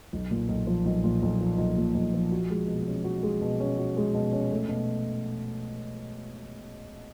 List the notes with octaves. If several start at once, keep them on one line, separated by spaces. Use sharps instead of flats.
B1
A#2
B1
F3
B1
A#2
B1
F3
B1
A#2
B1
F3
F#4
G#3
B2
C#4
F#4
G#3
B2
C#4
F#4
G#3
B2
C#4
A3
B2